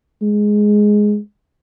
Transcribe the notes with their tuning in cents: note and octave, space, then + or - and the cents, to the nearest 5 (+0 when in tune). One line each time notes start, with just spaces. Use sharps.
G#3 +5